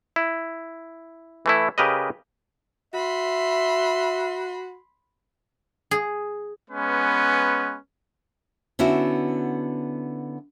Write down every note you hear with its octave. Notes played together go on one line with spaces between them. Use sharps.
E4
E3 A3 E4
C#3 G4 A#4 B4 D#5
F#4 E5 B5 C6
G#4
G#3 B3 C#4 B4
D3 B3 C#4 E4 F#4